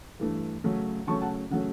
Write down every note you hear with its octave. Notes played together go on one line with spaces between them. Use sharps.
G2 E3 A3
C#3 F#3 A3 C#4
C#3 F#3 A3 C#4 A5 C#6
F#5 A5
C#3 F#3 A3 C#4 F#5